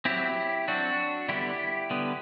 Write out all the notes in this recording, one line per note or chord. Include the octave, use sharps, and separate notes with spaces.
F#3 C4 E4 G4
F#3 C4 D4 F#4
D3 G3 B3 E4 G4
D3 G3 B3